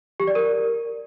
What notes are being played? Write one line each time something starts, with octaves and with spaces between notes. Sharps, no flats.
G4
D5
A#4